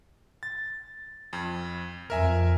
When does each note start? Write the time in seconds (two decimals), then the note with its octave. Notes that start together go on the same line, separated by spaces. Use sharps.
0.43 A6
1.33 F2
2.10 F2 A#4 E5 G#5